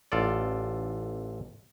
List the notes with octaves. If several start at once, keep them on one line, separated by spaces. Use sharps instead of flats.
A1 F4 A4 D5